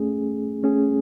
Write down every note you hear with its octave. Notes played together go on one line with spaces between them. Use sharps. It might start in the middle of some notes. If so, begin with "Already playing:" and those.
Already playing: A3 C#4 G#4
A3 C#4 G#4